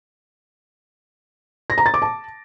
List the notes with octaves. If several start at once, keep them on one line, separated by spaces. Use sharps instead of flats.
A#6
A#5
A6
D6
A5